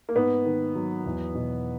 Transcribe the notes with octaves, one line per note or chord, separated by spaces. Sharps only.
A#3
G#2 B3
D#3
F#3
E2
B2